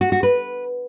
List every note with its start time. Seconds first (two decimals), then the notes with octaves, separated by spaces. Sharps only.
0.01 F#4
0.12 F#4
0.23 B4